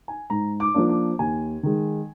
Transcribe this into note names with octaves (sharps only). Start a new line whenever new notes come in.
G#5
G#2 A#5
D6
F3 A#3 D4
D6
D#2 G#5
D#3 G#3